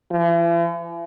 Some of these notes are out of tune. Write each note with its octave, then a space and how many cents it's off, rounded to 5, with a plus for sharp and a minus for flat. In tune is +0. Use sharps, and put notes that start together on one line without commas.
E3 +45